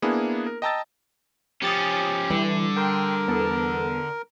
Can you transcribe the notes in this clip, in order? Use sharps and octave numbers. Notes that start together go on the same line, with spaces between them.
A#3 B3 D4 E4 G#4
A#4
D#5 G5 A5 A#5 E6 A6
F3 C#4 G4 D#6 A6 C#7
D3 E3 G3
A#4 G5 C6
E2 B3 A4